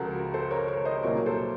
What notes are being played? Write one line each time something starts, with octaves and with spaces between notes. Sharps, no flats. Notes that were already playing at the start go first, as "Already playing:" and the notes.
Already playing: C#2 C#3 F3 F#4 A4 A#4
A4 C5
A#4 C#5
A#4 C#5
C5 D#5
C2 A#2 F#3 A#4 C#5
A4 C5